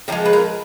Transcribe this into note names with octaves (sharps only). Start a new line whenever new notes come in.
D3 F3 G#3 A#4
B4
A#4